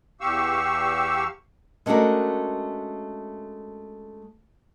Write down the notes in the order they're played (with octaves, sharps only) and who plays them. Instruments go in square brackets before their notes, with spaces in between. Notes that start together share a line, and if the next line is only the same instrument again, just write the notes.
[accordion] E2 G4 F5 C#6 E6
[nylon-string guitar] G#3 A3 C#4 D4 F#4 A#4